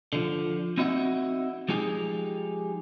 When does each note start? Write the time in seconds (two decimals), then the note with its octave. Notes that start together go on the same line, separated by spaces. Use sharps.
0.13 D3 F3
0.77 C4 D#4 E4 F#4 D#5 F#5
1.68 F3 G#3 D#4 G4 G#4